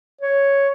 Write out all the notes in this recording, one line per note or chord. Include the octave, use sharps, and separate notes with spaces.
C#5